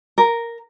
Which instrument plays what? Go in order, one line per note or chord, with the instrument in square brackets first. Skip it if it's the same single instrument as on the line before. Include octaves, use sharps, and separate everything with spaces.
[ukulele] A#4